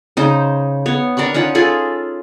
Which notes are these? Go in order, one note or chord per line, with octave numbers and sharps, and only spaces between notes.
C#3 D#4 C5
B3 C#5
D4 A#4 B5 C#6
C#4 D#4 F4 F#5
F4 G#4 A4 B5